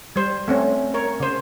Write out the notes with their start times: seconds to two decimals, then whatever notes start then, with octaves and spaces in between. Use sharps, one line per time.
0.16 G3 C5
0.48 A3 C4 C#4
0.94 A#4 C#5
1.20 C#3 C5